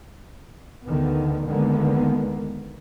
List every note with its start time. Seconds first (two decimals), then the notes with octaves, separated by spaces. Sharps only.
0.86 D2 D3 D#3 B3
1.48 D2 D3 D#3 G#3 A#3 B3